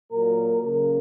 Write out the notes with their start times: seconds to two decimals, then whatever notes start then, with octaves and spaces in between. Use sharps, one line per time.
0.11 A#2 F#3 A#3 A#4
0.61 C#3 F#3 A#3 A#4